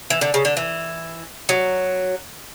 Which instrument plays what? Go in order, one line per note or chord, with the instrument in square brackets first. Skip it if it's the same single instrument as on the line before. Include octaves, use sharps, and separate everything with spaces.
[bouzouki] E3
D3
C#3
D3
E3
F#3